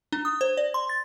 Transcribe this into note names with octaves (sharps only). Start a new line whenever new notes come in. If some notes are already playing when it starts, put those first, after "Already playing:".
D4
D#6
C5
D5
C6
A6